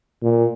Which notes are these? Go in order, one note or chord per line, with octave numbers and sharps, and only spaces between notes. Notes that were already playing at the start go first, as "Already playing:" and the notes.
A#2